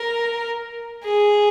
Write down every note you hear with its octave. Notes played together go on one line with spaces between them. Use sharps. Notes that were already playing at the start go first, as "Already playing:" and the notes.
Already playing: A#4
G#4